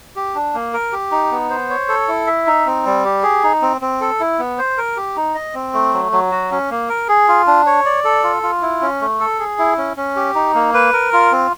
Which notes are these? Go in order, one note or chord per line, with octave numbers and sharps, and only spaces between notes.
G4
D4
A#3
A#4
G4
D#4
B3
C5
C#5
A4
E4
E5
D#4
C4
G3
G4
G#4
D#4
C4
C4
A4
E4
B3
C5
A#4
G4
D#4
D#5
C4
A3
F#3
F#3
F#4
C#4
A#3
A#4
G#4
F4
D4
C#5
D5
A4
F4
F4
E4
C#4
A3
A4
G#4
E4
C#4
C#4
G4
D#4
A#3
B4
A#4
F4
C4